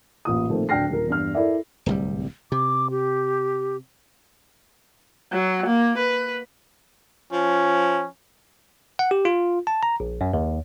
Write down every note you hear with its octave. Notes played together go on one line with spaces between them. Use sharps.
A1 A#2 F4 D#6
A#2 D#3 F3 A3 A#3 C4
D1 D4 G5 F6 A#6 C7
D#1 F4 A#4
E2 G2 F6
E4 A4 A#4 D5 E5
D1 C2 G3
C3 D6
G4
F#3
A#3
B4
F3 C#4
F#5
G4
F4
A5
A#5
A#1
F#2
D#2